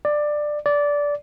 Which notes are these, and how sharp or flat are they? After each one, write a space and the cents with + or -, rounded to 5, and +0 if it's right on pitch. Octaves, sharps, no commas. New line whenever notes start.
D5 +15
D5 -15